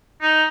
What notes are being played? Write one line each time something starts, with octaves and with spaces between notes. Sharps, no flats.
D#4